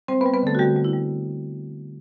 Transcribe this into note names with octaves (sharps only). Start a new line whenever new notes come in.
G3 C4 C5
B3 B4
G3
B3 B4
D3 A3 A4
F#4
D3 G3 G4
G3
E4
G3